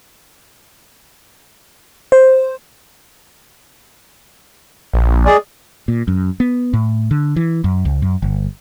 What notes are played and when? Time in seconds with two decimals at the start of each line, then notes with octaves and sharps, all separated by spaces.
2.12 C5
4.93 A#1
5.26 G#3 G#4 D5
5.88 A#2
6.08 F#2
6.40 B3
6.73 A2
7.11 D3
7.36 E3
7.64 F#2
7.85 C#2
8.02 F#2
8.22 G1